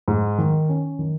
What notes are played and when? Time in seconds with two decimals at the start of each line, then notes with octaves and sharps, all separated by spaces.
0.08 G#2
0.38 D#3
0.69 C#4
0.99 D#3